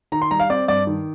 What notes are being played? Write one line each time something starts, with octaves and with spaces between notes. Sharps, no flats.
D#3 A#5
C6
G3 A#5
F5
C4 D5
G2 D5
D#3